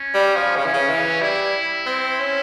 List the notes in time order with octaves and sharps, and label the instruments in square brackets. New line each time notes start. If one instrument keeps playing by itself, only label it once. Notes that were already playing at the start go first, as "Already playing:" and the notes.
Already playing: [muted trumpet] C#4
[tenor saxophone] G3
F3
[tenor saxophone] C#3 [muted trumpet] C#4
[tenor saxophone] E3
C#3
E3
[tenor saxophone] G3 [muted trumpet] E4
[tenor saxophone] C4
C#4